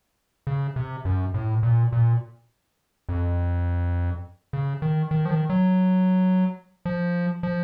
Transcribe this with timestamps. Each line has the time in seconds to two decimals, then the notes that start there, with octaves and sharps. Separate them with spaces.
0.47 C#3
0.76 C3
1.05 F#2
1.34 A2
1.63 A#2
1.93 A#2
3.09 F2
4.53 C#3
4.82 D#3
5.11 D#3
5.25 F3
5.31 D#3
5.50 F#3
6.86 F3
7.43 F3